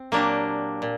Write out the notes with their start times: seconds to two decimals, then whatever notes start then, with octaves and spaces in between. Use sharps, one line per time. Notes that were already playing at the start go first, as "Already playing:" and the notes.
Already playing: C4
0.12 A#2 F#3 A#3 D4 G4
0.82 A#2